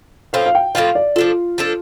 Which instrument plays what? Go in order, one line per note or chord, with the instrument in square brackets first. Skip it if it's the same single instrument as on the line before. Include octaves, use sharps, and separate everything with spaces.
[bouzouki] A2 F3 C4 F4 [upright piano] F5
[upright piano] F5
G5
[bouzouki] A2 F3 C4 F4 [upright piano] F5
[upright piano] D5
[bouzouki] F3 D4 A4 [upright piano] F4
[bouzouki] F3 D4 A4